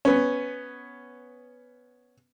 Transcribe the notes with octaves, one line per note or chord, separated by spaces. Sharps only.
B3 C#4